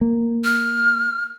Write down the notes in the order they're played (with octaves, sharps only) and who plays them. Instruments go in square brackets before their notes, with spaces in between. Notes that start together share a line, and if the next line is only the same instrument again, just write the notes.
[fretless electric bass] A#3
[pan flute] F6